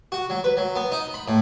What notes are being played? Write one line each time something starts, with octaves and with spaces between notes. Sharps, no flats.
F#4
F#3
B4
F#3
B3
D#4
B5
A2